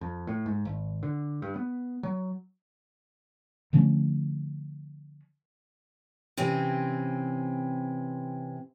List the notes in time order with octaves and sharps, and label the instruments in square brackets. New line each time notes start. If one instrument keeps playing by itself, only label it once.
[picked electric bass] F2
A2
G#2
G#1
D3
G2
B3
F#3
[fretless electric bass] D3 F3 A3 C#4
[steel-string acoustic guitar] C3 E3 C4 C#4